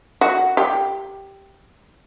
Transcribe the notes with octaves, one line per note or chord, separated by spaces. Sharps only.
F#4
G4